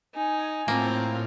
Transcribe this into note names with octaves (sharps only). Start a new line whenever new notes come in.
D#4 G#5
A2 A#3 C4 F4